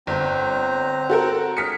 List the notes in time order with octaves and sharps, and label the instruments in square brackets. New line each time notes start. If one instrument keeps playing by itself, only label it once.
[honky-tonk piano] G1 [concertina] C4 A#5
[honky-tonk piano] F#4 A4 A#4
[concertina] G#4 A#4 [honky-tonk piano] F6 B6 C#7